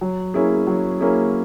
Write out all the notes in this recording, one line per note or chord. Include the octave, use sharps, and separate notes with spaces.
F#3
A#3 C#4 E4 G#4
F#3
A#3 C#4 E4 G#4